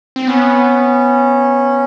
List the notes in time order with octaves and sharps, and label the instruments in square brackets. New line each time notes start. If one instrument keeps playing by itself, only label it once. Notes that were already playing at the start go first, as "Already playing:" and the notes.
[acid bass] C4
[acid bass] B3 [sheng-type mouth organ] C#4